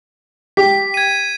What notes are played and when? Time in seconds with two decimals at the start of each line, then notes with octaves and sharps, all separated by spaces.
0.57 G4 B6
0.94 G#6 D#7